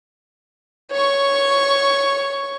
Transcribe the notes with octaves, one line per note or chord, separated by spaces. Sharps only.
C#5 C#6